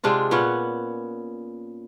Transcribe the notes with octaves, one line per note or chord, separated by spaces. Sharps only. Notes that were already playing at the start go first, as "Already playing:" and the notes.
C3 G#3 D4 F4
A#2 B3 C#4 F#5